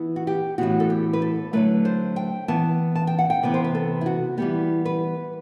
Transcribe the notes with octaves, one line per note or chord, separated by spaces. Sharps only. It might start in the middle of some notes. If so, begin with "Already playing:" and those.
Already playing: E3 B3
F#4
G4
A2 E3 B3 F#4
A4
G4
B4
A4
D3 F#3 A3 B4
C5
G5
E3 B3 A5
A5
G5
F#5
G5
C3 E3 B3 B4
C5
B4
A4
E4
F#4
E3 G3 B3 G4
B4